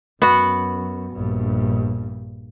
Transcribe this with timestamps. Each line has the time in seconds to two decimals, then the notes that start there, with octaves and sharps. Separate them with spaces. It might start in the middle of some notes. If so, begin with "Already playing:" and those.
0.22 F#2 B3 F#4
1.12 A#1 G2